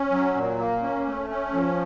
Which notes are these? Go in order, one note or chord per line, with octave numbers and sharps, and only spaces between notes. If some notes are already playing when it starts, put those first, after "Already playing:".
Already playing: C#4
F#3
A#2
A#3
C#4
A3
C#4
F3